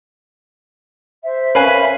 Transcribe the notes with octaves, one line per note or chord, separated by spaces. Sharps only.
C5 E5
C#4 A#4 B4 F5 G#5 B5